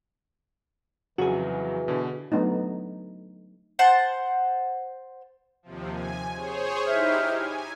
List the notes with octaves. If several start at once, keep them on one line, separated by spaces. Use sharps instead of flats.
F2 C#3 E3 F#3 F#4 G#4
B2 D3
F#3 A3 B3 D4 D#4
C5 F#5 A5
D#2 C3 F3
G#5
G#4 C5 C#5
D#4 E4 G4 C5 E5 F6
G#5